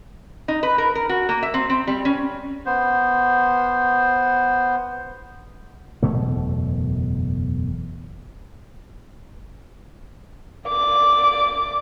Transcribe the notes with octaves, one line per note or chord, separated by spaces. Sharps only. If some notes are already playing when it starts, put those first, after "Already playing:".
D#4
B4
A#4
A#4
F#4
A#3
E5
C4
C4
G3
C#4
B3 C5
F#1 E2 B2 A3
D5 D6